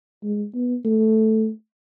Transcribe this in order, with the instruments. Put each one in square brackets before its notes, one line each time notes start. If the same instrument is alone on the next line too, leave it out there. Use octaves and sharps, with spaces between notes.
[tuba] G#3
B3
A3